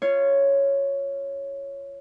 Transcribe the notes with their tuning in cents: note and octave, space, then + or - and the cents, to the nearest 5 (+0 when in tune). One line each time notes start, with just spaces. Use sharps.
F4 -20 C#5 +0 C6 -15